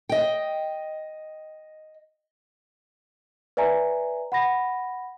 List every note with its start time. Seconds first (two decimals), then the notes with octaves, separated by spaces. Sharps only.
0.09 D#5 G5
3.57 B4 D5 E5 G#5 A#5
4.32 F#5 B5 A#6